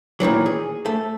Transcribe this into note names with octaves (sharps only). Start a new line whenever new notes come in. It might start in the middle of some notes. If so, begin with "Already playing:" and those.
A#2 D#3 E3 F#3
G#4
A3